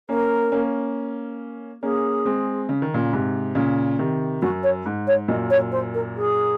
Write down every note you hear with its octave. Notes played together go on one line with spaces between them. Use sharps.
A#3 C#4 A#4
A#3 C#4
A#3 C#4 G#4
G#3 C4
C#3
D#3
A#2 C#3
G#2 C3
A#2 C#3
C3 D#3
F#2 F#4
C#5
G#2
C#5
F#2 A#2 D#5
C#5
C5
A#4
G#4